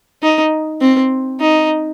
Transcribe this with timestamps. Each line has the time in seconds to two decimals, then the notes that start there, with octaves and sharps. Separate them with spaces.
0.23 D#4
0.81 C4
1.41 D#4